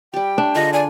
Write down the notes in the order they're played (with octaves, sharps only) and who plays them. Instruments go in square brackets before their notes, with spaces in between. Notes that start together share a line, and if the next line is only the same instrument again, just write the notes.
[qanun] G3 G4 [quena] G5
[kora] D4 [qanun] E5
[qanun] D3 F4 G#4 [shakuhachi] D#5
[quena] D5 [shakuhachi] G#5